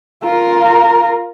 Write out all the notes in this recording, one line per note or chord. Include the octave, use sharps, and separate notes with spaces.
F4 A#4